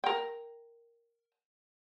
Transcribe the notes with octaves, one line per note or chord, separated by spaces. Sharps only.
A#4 G5